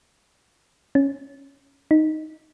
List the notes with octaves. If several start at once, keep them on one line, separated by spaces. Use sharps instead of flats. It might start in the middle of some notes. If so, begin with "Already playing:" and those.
C#4
D#4